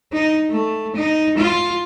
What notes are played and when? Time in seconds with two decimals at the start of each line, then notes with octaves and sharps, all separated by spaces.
0.13 D#4
0.50 A3
0.96 D#4
1.37 F4